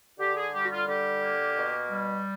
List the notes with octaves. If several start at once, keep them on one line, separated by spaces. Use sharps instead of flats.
D3 G4
G#4
G3 G4
F#4
F4
D3 G4
A#3
B2
G3